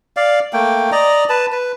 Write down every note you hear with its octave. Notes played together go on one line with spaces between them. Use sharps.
D5 F5
A3 A#3 G5
D5 D#5 A#5
B4 A5
B4